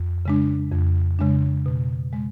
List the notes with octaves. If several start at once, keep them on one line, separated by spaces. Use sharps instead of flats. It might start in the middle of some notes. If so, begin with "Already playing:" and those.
Already playing: F2
C#3 G#3 D4
F2
C#3 G#3 D4
B2
G#3